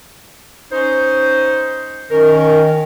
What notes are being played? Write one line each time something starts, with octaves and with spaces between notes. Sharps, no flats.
C#4 D#4 C5
D#3 C#4 A#4